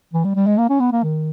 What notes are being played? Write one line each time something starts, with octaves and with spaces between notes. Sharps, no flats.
E3
G3
G3
G#3
A#3
C#4
B3
A#3
D#3